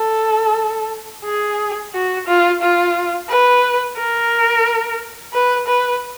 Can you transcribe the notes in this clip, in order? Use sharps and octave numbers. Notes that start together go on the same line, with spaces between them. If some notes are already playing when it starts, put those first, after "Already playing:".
Already playing: A4
G#4
F#4
F4
F4
B4
A#4
B4
B4